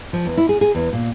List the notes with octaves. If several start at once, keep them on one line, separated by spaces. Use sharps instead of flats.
F3
E2
E4
G#4
G#4
E2
A#2